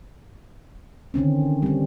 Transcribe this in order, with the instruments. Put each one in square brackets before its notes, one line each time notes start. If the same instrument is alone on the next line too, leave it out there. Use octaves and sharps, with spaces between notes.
[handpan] D3 D#3 C4 C#4
G3 C4